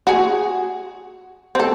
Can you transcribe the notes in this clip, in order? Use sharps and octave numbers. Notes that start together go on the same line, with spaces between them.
F#4 G#4
C4 A4